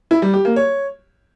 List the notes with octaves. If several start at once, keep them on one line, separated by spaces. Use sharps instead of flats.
E4
G3
G4
A#3
C#5